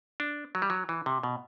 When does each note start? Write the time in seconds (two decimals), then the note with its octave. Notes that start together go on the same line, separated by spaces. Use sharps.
0.20 D4
0.55 F#3
0.62 G3
0.70 F#3
0.89 E3
1.06 C3
1.23 B2